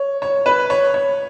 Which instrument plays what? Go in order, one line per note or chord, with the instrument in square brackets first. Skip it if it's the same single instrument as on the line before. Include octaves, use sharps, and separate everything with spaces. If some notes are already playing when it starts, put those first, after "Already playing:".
Already playing: [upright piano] C#5
C#5
B4
C#5
C#5